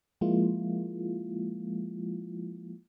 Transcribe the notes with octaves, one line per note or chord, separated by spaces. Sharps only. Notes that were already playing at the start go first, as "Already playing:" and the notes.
F3 G#3 A#3 E4 F4